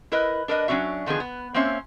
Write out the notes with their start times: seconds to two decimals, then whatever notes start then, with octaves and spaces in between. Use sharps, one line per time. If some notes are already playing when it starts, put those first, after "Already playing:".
0.12 E4 A#4 B4 D#5
0.48 D4 A#4 B4 D#5
0.68 F#3 C#4 D4 F#4 E5
1.06 D3 D#3 F3 B3 G#4
1.20 B3
1.54 A#3 C4 C#4 C5 E5